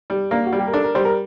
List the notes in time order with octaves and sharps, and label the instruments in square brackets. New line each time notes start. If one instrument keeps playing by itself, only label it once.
[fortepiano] G3
[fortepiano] A#3 [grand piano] D4
[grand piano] F#4
[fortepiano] G3
[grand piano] G4
A#4
[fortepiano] D4 [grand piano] A4
[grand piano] A#4
[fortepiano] G3 [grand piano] C5
[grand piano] A#4